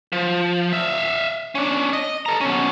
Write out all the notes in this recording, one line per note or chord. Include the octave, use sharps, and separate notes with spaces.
F3
E5 F5
C#4 D4
D#5
A4 A#5
B2 C#4